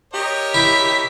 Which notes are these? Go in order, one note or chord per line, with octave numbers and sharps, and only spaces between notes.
G4 A#4 C#5 D#5
E4 B6